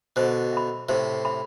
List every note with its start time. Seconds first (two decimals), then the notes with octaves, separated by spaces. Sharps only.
0.16 B2 D3 C5
0.53 E5 B5
0.89 A2 C3 C5
1.25 E5 B5